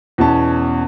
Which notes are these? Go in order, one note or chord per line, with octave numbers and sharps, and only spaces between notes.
E2 B2 C#4 A5